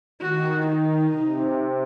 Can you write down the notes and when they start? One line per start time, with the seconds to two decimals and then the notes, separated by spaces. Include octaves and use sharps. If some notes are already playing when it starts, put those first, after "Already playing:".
0.21 D#3 F#4
0.68 D#4
1.15 C3